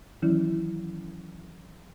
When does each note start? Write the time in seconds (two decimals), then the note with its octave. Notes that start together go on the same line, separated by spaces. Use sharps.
0.22 D#3 E3 F#3 C#4 E4